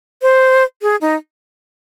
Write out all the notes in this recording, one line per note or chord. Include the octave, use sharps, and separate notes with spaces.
C5
G#4
D#4